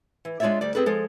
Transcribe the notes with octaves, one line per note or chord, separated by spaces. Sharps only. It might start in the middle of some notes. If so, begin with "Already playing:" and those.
E3
G#3 D4 F4 C#5 D5 E5
D2 G3 D5
C4 G#4 A4 B4
F3 G#3 A4